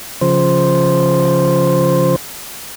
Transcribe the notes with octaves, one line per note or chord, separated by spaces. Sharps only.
C#3 F3 C5